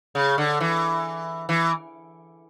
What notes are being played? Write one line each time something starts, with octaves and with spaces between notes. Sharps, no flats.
C#3
D3
E3
E3